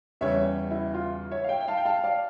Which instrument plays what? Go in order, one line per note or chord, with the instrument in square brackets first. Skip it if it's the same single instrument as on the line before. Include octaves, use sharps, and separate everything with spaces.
[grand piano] E2 C#3 G3 C#5 E5
E4
F4
C#5 E5
F5
E5 G5
G5
F5 A5
G5
F5 A5
D5 F5